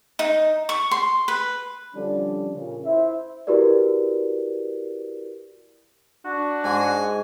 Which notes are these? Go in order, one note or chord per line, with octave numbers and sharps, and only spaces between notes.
D#4
C#6
C6
B4
D3 F3 G3 C#4 D4
A#2 C#3
E4 C5 E5
E4 F#4 G4 A#4 B4 D5
D4 F#4
G#2 G#3 G#5